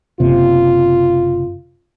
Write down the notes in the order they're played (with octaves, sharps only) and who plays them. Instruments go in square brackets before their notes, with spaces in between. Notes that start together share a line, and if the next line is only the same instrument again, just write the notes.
[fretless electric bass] F#1 C3 [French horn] F4